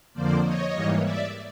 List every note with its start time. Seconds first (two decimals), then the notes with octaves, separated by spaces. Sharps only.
0.14 F2 D3 F3 A#3 C5 D5
0.43 C#5 D#5
0.72 G#2 E3 G3 A#3
1.01 D5 E5